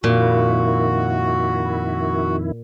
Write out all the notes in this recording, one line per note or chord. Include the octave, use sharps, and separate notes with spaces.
F2 A#2 D#3 E4 F#4